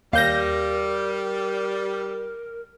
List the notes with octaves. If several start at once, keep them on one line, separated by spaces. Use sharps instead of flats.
D#2 G3 A#4 F5 G6 A#6